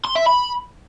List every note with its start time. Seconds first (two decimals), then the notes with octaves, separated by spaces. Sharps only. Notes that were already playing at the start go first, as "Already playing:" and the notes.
0.05 C6
0.16 E5
0.27 B5